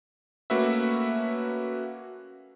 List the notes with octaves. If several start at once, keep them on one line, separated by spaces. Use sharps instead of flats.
A3 A#3 C#4 F#4 B4 E5